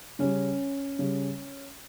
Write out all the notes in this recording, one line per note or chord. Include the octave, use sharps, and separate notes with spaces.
C#3 G3 C#4
C#3 G3